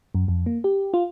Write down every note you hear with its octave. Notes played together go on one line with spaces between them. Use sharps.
F#2
F2
A#3
G4
F4